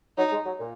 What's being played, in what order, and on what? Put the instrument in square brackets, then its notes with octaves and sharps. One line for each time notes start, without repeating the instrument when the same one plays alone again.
[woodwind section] F#3 [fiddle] D#4
[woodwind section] G#3
F#3
A#2